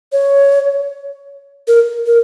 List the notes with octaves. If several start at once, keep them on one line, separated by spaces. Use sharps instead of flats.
C#5
A#4
A#4